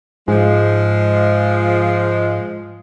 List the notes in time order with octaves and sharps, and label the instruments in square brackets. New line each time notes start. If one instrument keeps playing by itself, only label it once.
[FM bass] G#2 [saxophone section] F3 G#3